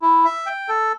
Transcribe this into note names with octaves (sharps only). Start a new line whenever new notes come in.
E4
E5
G5
A4